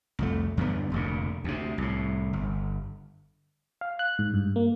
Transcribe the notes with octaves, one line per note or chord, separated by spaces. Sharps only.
C2 F2 A3
E2 G2 D3 B3
F1 D2 A#2
D2 C3
C2 A2
G1
F5
F#6
G#2
G2
A#3